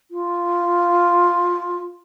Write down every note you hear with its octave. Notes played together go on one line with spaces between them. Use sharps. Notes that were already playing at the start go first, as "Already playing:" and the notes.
F4